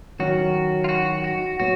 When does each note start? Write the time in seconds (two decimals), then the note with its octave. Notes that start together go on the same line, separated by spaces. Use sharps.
0.19 D#3 F#3 C#4 F#4
0.84 F4
0.89 F#4
1.24 F#4
1.59 F#3 B3 F#4